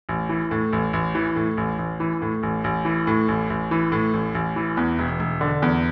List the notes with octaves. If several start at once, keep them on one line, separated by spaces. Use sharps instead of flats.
A1
E3
A2
A1
A1
E3
A2
A1
A1
E3
A2
A1
A1
E3
A2
A1
A1
E3
A2
A1
A1
E3
E2
E1
E1
D3
E2